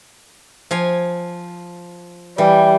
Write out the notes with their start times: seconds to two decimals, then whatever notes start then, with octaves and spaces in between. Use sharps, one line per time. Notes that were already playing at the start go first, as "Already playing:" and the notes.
0.71 F3 F5 G#5
2.38 E3 G3